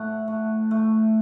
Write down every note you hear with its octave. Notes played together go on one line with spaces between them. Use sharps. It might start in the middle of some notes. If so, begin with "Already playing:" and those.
Already playing: A2 A3 F#5
A3
A3